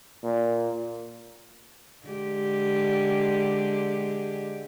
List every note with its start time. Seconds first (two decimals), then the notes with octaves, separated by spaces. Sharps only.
0.24 A#2
2.06 D3 G#3 G4